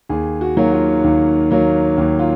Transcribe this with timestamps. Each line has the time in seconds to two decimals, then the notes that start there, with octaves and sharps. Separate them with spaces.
0.09 D#2 G#4
0.41 F#4
0.57 D#3 F#3 A#3
0.72 F4
1.04 D#2
1.50 D#3 F#3 A#3
1.97 D#2
2.19 F4